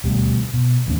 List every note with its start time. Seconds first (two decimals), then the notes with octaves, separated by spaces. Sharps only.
0.04 D#1 D2 B2 G3
0.54 B2
0.86 A1 D#2 C#4